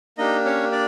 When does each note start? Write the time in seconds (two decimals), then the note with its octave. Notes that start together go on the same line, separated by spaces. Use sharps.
0.18 A#3 D4 D#4 G4 D#5
0.45 C#4 C#5
0.72 D4 D5